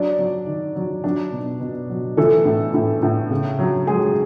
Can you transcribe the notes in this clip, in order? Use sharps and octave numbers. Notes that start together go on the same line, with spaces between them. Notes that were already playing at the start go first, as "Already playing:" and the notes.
Already playing: F#3 D4 D5
F#3
D#3
F#3
F#3 D4 D5
B2
B2
F#3
E3 A3 A4
A2
A2
A2
C#3
F#3
F#3 G#3 G#4